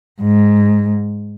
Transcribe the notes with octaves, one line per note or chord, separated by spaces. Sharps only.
G#2